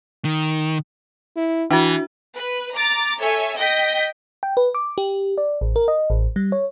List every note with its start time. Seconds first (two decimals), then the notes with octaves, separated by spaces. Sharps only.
0.25 D#3
1.36 E4
1.70 E3 D4 E4 F#4
2.35 B4
2.74 A#5 D6 A6
3.20 A4 C#5 E5 G#5
3.57 D#5 G5 G6 A#6 B6
4.43 G5
4.57 B4
4.74 D6
4.98 G4
5.38 D5
5.61 A1
5.76 A#4
5.88 D#5
6.10 A1
6.36 G3
6.52 C#5